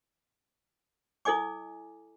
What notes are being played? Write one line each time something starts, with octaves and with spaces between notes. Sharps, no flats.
E4 A4 D#5 G#5 D6